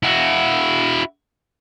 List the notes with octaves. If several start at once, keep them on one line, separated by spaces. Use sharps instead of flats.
E4 F#4